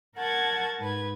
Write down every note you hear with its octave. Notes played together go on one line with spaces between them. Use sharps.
A#4 F#5 A5 C#6 G#6 A6
G#2 B4 G#6